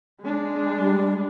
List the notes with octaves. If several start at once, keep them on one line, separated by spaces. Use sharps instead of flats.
G#3 D4
G3